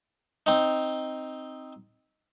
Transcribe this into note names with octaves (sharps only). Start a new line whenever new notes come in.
C4 D#4